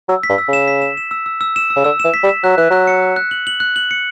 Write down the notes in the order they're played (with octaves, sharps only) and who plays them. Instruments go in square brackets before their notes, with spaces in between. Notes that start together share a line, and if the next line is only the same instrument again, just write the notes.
[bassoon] F#3 [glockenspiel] E6
[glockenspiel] B6
[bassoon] G2
[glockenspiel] E6
[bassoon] C#3 [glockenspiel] E7
[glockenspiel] B6
E7
E7
E6
E6
E6
E7
E6
[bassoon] C#3
[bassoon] D3 [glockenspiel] E6
[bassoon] E3 [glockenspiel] E7
[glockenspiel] B6
[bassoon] G3
[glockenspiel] E7
[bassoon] F#3 [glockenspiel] F#6
[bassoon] E3 [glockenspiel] F#6
[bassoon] F#3 [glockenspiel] F#6
[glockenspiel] C#7
F#6
F#6
F#7
F#7
F#6
F#7
C#7